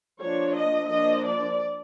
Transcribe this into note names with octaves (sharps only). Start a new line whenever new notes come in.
F3 A#3 D4 C#5
D#5
F3 A#3 D4 D#5
D5